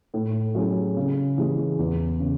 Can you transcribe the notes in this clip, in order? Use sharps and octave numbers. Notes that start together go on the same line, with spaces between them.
A2
F#3 C#4 E4 G#4
C#3
E3 G#3
E2
C#3